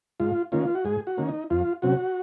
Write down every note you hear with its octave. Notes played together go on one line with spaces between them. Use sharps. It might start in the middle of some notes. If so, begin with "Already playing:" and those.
G#2 F4
D#3 A#3 C#4 F4
F#4
G#2 G#4
F#4
D#3 A#3 C#4
D#4
F2 F4
C3 F#3 C#4 F#4